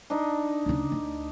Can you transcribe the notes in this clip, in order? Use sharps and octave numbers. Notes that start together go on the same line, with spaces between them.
D4 D#4
D2 C#3
D2